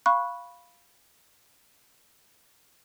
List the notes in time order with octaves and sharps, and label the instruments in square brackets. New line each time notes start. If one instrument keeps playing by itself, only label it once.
[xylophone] F5 B5 C#6 F#6